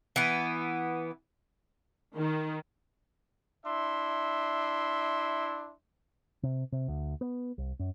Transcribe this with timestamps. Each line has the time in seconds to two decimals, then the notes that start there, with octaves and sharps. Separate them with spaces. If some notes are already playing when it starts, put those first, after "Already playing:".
0.16 E3 B3
2.16 D#3
3.66 D4 E4 E5 C6
6.43 C3
6.72 C3
6.88 D2
7.21 B3
7.58 C2
7.79 F#2